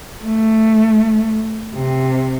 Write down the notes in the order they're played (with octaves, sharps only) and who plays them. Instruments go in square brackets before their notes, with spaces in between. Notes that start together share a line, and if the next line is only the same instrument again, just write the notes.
[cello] A3
C3